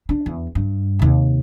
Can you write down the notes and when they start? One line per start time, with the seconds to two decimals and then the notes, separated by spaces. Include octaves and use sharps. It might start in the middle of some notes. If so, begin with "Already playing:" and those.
0.09 D4
0.26 E2
0.55 G2
0.99 D#2 C3